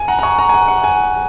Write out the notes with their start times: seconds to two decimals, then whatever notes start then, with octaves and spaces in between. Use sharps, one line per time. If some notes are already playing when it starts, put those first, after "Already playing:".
Already playing: G#5
0.08 F#5 A#5
0.19 A#5
0.23 G#5 C#6
0.38 F#5 A#5
0.49 G#5
0.54 F#5
0.68 F#5
0.84 G#5